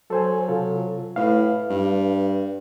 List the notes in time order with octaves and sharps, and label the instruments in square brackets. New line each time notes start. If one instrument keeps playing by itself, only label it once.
[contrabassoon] F#3 [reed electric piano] A4 C5 G#5
[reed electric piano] C3 F4 A4
[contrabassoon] A2 [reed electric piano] B4 F5
[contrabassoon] G2